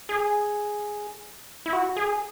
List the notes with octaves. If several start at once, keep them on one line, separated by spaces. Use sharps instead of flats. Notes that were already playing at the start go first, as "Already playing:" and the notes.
G#4
E4
F#4
G#4